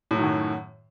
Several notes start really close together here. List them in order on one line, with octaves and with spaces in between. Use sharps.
A2 F#3 D#3 F#2